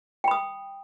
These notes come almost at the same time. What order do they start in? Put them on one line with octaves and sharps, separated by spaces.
G5 B5 D#6